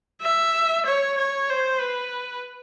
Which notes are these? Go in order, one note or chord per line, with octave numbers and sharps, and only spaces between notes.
E5
C#5
C#5
C5
B4